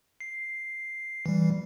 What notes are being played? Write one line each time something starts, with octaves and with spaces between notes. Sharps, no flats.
C7
E3 G3